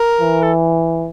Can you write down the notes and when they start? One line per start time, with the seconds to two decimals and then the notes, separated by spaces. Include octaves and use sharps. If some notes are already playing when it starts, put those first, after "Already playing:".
Already playing: A#4
0.21 E3
0.43 A4